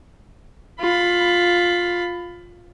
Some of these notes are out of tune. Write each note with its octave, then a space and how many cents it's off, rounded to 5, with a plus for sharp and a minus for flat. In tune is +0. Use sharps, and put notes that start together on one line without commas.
F4 +10 B5 +20